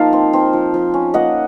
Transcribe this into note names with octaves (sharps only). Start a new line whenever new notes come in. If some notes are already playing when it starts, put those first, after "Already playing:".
Already playing: F3 A#3 D#4 D#5 F5 A5
C4
C4
F3
F3
C#4
A#3 D#5 F#5